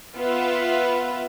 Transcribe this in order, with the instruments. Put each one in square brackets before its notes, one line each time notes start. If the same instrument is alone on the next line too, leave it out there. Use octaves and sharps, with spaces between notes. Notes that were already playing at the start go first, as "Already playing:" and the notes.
[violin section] B3 F4 B4 E5